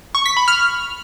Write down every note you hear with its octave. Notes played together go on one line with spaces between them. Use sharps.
C#6
B6
B5
F6